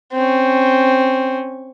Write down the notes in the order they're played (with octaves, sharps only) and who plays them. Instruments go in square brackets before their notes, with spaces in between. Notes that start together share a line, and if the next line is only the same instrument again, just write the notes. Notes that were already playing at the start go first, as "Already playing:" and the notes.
[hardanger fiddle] C4 C#4